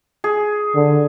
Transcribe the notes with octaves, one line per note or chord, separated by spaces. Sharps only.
G#4
D3